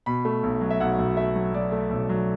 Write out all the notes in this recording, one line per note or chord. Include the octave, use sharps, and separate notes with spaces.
B2 B5
A3
B1
F#3
E5
B1 F#5
B1
A3 E5
F#3
F#3 D5
A3
B1
F#3